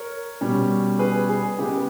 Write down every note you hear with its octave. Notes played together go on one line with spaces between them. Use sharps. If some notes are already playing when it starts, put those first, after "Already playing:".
Already playing: A#4 C#5
B2 G3 C#4
G#4 B4
G#4
C#3 G#3 B3 G4